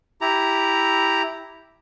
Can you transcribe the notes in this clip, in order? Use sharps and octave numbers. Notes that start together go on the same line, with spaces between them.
E4 G4 A#5